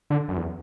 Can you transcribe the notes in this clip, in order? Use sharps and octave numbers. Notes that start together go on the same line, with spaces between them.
D3
F#2
E2